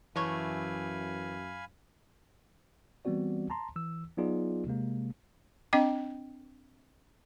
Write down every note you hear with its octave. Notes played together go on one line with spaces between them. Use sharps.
F#2 E3 G#3 A3 C#5 F5 G#5 B5
E3 G3 B3 C4 F#4 D5
A5 A#5 C6
E3 E6
F#3 B3 D#4 F4 G#4 D5
C3 G#3 A#3
C4 D4 D#5 G5 D6